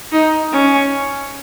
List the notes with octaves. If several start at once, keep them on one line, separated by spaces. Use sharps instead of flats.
D#4
C#4